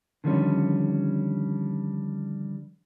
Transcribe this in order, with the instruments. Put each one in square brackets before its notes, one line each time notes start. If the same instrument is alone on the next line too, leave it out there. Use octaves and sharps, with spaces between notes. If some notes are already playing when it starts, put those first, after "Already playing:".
[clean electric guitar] D3 D#3 F3 G3 C#4